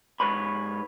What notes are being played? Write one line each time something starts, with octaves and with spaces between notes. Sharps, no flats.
G#2 B4 C#5 B5